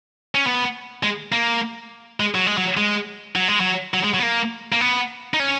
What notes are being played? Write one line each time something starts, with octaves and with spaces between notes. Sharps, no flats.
C#4
B3
G#3
A#3
G#3
F#3
G#3
F#3
G#3
F#3
G#3
F#3
F#3
G#3
F#3
B3
A#3
A#3
B3
D#4
C#4